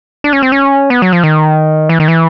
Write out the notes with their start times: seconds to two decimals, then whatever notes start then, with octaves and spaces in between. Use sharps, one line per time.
0.24 D4
0.33 C#4
0.42 C4
0.52 C#4
0.90 B3
1.02 F#3
1.13 F3
1.24 D#3
1.89 E3
2.00 D#3
2.08 E3